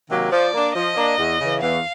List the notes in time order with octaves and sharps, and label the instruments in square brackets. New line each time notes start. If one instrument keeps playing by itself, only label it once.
[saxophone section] C3 D#3 F#3 A#3
[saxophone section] F3 [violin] D5
[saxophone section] A#3 D4
[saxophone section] F3 [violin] D#5
[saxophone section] A#3 D4
E2
C#3 E3
[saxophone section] E2 [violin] F5